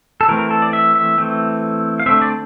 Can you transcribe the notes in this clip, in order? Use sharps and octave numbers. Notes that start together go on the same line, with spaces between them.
A4
E3 A3 C4 A#4
A#4
A4
D5
E5
E5
E3 A3 C4
F5
D3 A3 C4 E5
D5